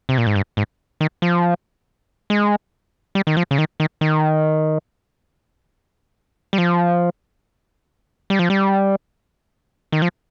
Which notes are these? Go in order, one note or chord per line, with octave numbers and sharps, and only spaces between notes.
C3
A#2
G#2
G2
G#2
D#3
F3
G#3
G3
D#3
F3
C#3
D#3
D#3
D#3
G3
F3
G3
F3
G3
D#3
F3